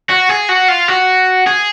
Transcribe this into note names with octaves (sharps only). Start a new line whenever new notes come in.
F#4
G#4
F#4
F4
F#4
G#4